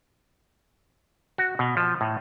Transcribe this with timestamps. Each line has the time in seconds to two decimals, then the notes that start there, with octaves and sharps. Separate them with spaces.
1.38 F#4
1.59 B2
1.77 F3
2.01 A2